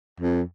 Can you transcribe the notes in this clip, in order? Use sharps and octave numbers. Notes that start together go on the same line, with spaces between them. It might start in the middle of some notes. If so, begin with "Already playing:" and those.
F2